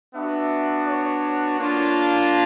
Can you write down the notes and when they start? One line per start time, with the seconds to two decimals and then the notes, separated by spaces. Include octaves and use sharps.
0.15 B3 D4 F#4 E5
0.87 C#5
1.58 A#3 D4 F4